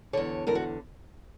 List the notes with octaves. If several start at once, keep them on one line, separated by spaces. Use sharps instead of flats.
E2 D3 C#5
E2 D3 A#4
F#4